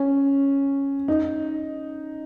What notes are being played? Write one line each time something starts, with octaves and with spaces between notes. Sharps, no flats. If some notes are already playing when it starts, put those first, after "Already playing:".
Already playing: C#4
D#4